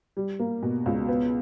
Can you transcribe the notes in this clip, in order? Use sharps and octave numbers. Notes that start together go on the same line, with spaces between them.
G3
A#3
B2
C#2
B3